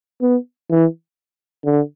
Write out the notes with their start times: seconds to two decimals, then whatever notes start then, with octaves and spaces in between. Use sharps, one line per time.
0.22 B3
0.70 E3
1.65 D3